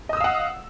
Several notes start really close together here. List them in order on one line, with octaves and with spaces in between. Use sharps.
D#5 D#6 E6 F5 F#5